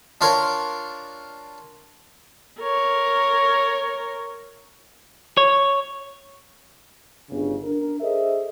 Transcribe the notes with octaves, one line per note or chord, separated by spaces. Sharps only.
D4 F4 A#4 C#5
A#4 C#5
C#5
G1 C#3
D4 A#4
G#4 A4 C5 D#5 E5